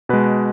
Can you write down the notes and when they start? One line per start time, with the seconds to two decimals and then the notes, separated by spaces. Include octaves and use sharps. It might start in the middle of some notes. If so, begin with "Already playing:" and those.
0.09 B2 G#3 B4